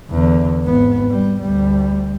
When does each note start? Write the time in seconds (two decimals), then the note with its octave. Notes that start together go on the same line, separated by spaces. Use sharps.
0.11 E2 D3
0.64 G#1 B3
1.09 G3
1.41 D2 G3